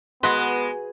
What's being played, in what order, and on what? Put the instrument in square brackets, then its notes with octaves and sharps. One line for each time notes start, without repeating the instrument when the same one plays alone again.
[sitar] G#3 [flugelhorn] B3 [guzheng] F#4 B4 [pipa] C6